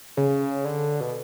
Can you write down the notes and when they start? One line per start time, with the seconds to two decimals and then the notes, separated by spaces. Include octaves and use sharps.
0.17 C#3
0.65 D3
1.01 B2